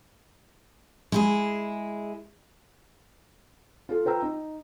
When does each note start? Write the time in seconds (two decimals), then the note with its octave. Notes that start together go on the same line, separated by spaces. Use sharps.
1.12 G#3 E4 G#4
3.89 F4 A4
4.05 F4 B4 G5 A#5 E6
4.22 D#4